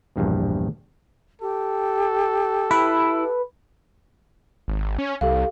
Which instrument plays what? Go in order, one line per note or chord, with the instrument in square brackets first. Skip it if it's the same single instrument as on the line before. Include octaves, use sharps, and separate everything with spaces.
[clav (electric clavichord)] A#1 E2 G2 B2
[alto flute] G4 [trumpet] A4
[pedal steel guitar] E4 [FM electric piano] B4
[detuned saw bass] G#1
C#4
[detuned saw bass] C2 [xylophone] G4 A4 F5